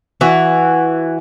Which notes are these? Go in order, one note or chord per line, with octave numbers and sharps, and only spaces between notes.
E3 F#4